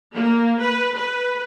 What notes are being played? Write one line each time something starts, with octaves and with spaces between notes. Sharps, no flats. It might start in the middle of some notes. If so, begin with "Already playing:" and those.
A#3
B4
B4